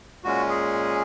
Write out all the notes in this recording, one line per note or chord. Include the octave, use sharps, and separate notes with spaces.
A#2 G#3 C#4 F#4
G#4